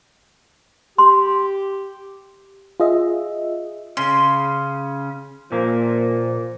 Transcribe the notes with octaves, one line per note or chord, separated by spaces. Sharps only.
G4 C6
F4 G#4 D#5 E5
C#3 C#4 C6
A#2 F3 A#3